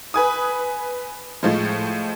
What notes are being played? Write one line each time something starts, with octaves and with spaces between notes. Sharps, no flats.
B4 G#5 D#6
A2 F3 G#3